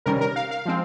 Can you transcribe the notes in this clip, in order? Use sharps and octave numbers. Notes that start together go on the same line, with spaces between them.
C3 D#3 G3 C#4 A#4
A#4
F5
F5
F3 G#3 C4